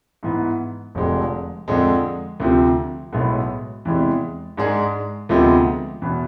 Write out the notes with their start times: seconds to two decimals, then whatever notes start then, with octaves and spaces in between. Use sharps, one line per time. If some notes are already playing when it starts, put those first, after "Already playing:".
0.23 G#2 E3 B3
0.95 F1 F2 D3 G#3
1.68 F2 D3 G#3
2.40 D2 C3 F3
3.13 B1 A2 G#3 B3
3.85 E2 C3 E3 G#3
4.57 G#2 G#3 D4 G#4
5.29 D2 C3 F3 G#3 B3
6.02 E2 B2 B3